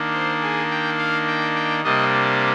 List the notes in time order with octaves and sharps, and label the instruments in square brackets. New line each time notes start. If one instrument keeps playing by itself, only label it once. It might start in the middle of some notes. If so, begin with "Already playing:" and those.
Already playing: [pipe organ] D#3 A#3 D4
C5
G#4
G5
F5
G5
G5
C3 G3 A#3 D4 D#5